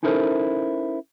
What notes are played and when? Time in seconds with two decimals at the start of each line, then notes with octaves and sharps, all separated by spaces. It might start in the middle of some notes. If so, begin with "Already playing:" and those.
0.03 C#4 D#4 E4 A4 A#4 C5